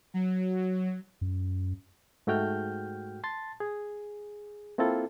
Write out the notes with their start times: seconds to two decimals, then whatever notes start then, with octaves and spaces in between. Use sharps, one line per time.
0.14 F#3
1.21 F#2
2.27 G#2 A3 F#4 G5 F6 G6
3.24 A5 C6 A6
3.60 G#4
4.78 A#3 C4 E4 F4 A4